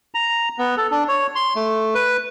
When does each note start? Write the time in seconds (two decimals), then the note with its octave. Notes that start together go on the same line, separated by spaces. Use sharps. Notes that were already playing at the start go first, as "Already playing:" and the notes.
0.14 A#5
0.58 B3
0.77 A4
0.91 D4
1.08 C#5
1.35 C6
1.56 A3
1.95 B4